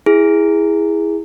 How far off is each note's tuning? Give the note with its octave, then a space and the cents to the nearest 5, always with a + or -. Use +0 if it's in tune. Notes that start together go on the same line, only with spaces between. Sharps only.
E4 -5 G#4 -10